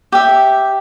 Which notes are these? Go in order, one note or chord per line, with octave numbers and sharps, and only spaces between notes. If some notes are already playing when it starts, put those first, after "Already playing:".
G4 E5